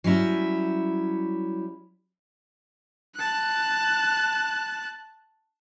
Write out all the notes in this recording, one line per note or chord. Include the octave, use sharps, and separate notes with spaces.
F#3 G3 C#4 E4
A5 F#6